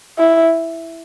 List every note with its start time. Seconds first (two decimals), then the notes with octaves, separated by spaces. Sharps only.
0.19 E4